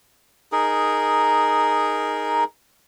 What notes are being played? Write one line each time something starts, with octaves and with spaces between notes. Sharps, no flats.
D#4 G#4 A#4